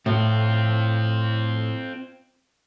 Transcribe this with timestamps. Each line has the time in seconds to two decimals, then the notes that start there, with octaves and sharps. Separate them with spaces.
0.06 A2 C4 F4